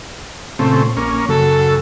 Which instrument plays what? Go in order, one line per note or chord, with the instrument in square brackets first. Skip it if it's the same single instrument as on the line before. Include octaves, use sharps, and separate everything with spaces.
[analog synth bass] A#2 [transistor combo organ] C#3 A3 C4
[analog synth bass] A#1 [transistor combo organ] A#3 C#4
[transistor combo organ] F#2 [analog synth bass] C#3 [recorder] A4